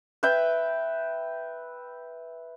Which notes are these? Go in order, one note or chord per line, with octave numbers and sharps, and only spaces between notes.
B4 E5 G5